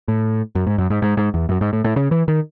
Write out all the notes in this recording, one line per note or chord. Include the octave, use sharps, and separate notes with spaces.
A2
F#2
G#2
F#2
G#2
G#2
G#2
E2
F#2
G#2
A2
A2
C#3
E3
D#3